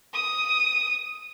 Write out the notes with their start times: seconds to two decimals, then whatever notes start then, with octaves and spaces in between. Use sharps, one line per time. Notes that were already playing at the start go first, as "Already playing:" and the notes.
0.13 D#6